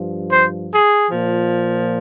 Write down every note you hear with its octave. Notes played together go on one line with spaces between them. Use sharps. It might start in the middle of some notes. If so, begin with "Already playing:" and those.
Already playing: G2 F3
C5
G#4
A#2 F3